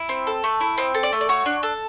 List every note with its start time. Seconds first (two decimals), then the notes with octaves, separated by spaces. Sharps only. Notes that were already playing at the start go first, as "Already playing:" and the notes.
Already playing: E4
0.09 C4
0.27 A4
0.44 A3
0.61 E4
0.78 C4 D#5
0.94 A4
1.03 D5
1.13 A3
1.21 D5
1.29 F#4 C#5
1.46 D4
1.63 A4